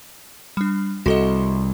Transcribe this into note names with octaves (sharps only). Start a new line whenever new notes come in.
G3 D4
C2 F#4 A4 D#5